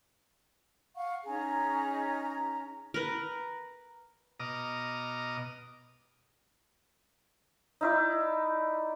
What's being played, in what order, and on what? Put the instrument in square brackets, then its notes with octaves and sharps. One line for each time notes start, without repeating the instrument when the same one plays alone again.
[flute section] F5 F#5 C#6
C#4 D#4 G#4 A#5
[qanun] A#4 B4
[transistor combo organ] B2 D#5 A#5 D6 D#6 F6
[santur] D#4 E4 D5